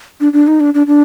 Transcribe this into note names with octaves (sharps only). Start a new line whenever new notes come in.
D4
D4
D#4
D4
D4
D4